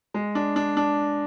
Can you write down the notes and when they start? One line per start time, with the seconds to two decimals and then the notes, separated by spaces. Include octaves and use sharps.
0.14 G#3
0.35 D4
0.56 D4
0.77 D4